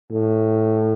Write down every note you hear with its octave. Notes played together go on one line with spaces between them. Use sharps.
A2